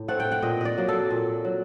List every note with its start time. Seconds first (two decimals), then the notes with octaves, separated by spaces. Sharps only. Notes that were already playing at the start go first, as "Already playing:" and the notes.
Already playing: A2
0.08 A3 C4 F#5
0.20 G5
0.32 F#5
0.42 A#2 D#5
0.61 D5 D#5
0.78 F#3 A#3
0.88 A4
1.11 A#2
1.45 F#3